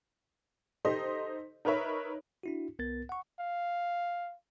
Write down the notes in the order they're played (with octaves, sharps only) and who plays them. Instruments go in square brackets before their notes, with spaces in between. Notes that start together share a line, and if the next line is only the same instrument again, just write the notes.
[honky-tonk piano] D#4 G4 A4 C5 D#5 C6
D#4 A#4 B4 C#5 E5
[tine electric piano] D4 E4 F#4
C2 B3 A#4 A6
F#5 C#6
[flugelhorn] F5